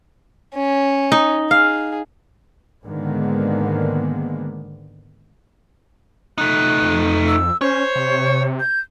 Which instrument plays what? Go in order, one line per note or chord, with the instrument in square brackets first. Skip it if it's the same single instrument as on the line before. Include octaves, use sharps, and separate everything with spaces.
[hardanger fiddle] C#4
[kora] D#4
[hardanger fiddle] G#4 [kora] F5
[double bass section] G#2 D3 D#3 G#3 A#3 B3
[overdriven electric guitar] A3 D#4 [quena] F#6
[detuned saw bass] F2
[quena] E6
[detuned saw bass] C#4 [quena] C5 [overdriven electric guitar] C#5
[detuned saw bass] C3
[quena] G6